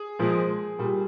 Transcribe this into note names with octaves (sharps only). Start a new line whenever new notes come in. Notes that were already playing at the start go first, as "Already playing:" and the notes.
Already playing: G#4
A#2 F3 G#3
A#2 G3